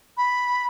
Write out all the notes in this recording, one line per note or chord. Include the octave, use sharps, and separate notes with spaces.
B5